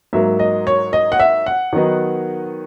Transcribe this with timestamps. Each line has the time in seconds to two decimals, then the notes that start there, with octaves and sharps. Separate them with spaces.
0.13 G#2 F#3 A#3 E5
0.39 D#5
0.67 C#5
0.93 D#5
1.12 F#5
1.20 E5
1.46 F#5
1.73 D#3 F#3 B3 D#4